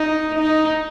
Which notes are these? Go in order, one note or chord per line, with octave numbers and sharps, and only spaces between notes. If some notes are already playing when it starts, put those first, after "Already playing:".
Already playing: D#4
D#4